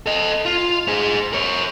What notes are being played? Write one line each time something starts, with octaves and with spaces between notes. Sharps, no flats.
A4 D#5
F4
G#4 C5
A#4 C#5